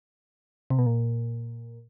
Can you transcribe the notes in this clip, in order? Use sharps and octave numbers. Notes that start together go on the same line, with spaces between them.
C3
B2
A#2